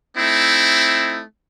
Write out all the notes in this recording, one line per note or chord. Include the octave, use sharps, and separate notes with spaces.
A3 C4 D#4 E4